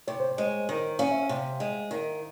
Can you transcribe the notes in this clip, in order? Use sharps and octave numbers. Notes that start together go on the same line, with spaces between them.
C3 C#5
C5
C#5
G#3
D#3
C#4 F5
E5
F5
C3
G#3
D#3